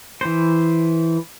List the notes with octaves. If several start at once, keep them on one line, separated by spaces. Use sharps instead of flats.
E3 C5